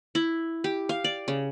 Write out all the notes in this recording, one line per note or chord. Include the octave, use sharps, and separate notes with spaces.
E4
G4
F5
D5
C#3